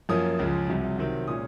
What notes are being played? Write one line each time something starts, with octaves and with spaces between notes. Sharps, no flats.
F#2 F3 A#3 C#4 D#6
C#2 C#3 F3 G#3
C2 C3 F#3
C3 D#3 F#3 C4
A#2 G#3 C#4 D#6